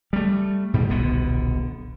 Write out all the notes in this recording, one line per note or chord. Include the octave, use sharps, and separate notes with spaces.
G3 A3
G#2 B2 D#3 G3
D#1 B1 D3 B3